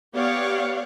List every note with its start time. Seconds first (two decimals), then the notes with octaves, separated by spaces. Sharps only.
0.15 B3 G4 C#5 D5 F5 F#5